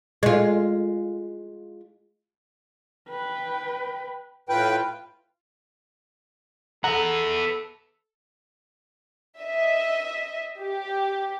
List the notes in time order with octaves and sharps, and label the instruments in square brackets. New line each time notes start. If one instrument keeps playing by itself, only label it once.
[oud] G#3 F4
[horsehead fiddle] B4 G5
[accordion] A2 B4 G5 [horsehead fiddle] F4
[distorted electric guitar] B3 E5 [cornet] A4 [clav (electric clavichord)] F#5 [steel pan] A#5
[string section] D#5 E5
G4